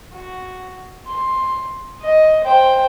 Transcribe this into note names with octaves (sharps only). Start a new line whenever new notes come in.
F#4
C6
D#5
C5 G5